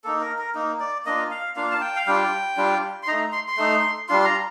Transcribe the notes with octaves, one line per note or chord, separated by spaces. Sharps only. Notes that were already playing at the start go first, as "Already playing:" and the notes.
A#3 D#4 A4
A#4
A#4
A#3 D#4
D5
A#3 D4 F4 D#5
F5
A#3 D4 F4 F5
A5
G5
F5
G3 D4 F4 G5
G3 D4 F4
C6
A3 D#4 A#5
C6
C6
A3 D#4
G3 D4 F4 C6
C6
A#5